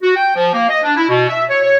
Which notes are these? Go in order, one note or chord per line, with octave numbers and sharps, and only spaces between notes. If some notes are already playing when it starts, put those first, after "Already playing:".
F#4
G5
F3
A#3
D#5
D4
E4
B2
E5
C#5
C#5